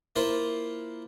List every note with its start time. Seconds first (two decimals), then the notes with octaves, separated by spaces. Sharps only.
0.16 A#3 E4 F4 C5